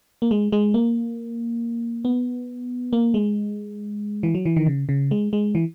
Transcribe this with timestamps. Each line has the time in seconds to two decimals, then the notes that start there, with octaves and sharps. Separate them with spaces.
0.22 A#3
0.31 G#3
0.52 G#3
0.74 A#3
2.05 B3
2.93 A#3
3.14 G#3
4.23 E3
4.35 F#3
4.46 E3
4.56 D#3
4.67 C#3
4.89 C#3
5.11 G#3
5.33 G#3
5.55 E3